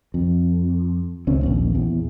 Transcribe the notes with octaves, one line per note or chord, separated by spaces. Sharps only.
F2
C#2 C4 C#4
A#1 D#2
E2